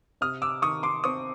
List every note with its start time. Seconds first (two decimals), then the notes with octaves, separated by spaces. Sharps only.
0.21 C3 D#6 F6
0.42 D6 E6
0.62 D#3 C#6 D#6
0.83 C6 D6
1.04 C4 C#6 D#6